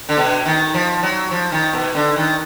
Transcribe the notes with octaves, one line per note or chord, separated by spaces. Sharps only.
D3
B2
D#3
F3
F#3
F3
D#3
B2
D3
D#3